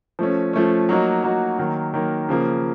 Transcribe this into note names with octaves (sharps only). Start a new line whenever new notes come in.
F3 A3 C#4
F3 A3 C#4
F#3 A#3 D#4 F#4
F#3 A#3 D#4 F#4
D#3 F#3 A#3
D#3 F#3 A#3
C#3 F3 A#3